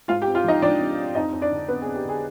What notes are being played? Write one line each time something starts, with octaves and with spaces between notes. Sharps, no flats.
G#2 F4 F5
G4 G5
C4
F4 F5
F3 D#4 D#5
F3 D4 D5
C4
C4
F2 D#4 D#5
F2
D4 D5
D3
F2 B3 B4
G#4
F2
G4
D3 G#4